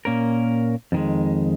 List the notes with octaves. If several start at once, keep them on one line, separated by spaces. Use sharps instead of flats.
A#2 A#3 C#4 A#4
F2 D#3 G#3